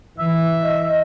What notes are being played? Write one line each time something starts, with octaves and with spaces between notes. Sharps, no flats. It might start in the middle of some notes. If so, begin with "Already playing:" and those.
E3 E5
D#5